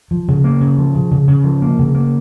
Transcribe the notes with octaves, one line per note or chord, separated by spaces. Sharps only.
F3
C#3
A#3
C#3
F3
C#3
C#3
C#3
F3
A#3
C#3
A#3